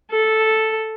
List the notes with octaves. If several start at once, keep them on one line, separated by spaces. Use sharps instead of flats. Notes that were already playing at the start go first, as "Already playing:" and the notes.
A4